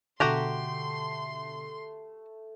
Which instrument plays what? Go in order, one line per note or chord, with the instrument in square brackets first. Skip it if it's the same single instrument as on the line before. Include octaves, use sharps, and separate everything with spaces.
[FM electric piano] B2 D3 [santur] A3 [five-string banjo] F#4 G4 A#5 [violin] C6